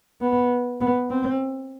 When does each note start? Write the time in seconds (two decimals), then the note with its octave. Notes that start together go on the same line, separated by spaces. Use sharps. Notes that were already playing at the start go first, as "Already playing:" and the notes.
0.21 B3
0.81 B3
1.10 C4